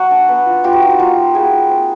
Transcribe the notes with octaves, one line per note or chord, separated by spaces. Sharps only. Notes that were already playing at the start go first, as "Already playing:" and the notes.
Already playing: F#3 F#4
D4
B3
F4
G3 F4 G4
F#4
D#4 F4
F#4
A#3 F4 G4
G3
G3 F#4 G#4
F4
C4